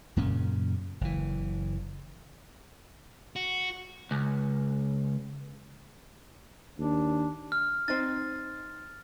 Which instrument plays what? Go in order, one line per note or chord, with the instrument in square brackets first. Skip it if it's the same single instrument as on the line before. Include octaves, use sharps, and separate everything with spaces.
[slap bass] F#2 A#2 C#3 C#4
F#1 E3
[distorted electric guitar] F#4
[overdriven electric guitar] C#2
[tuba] D#2 [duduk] D4
[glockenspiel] F6
[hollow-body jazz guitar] C4 D#4 [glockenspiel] A6